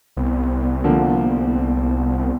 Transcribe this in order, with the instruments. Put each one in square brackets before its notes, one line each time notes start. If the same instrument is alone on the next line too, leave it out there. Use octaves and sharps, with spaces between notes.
[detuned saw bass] C2 [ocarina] B3
[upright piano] D3 F3 A#3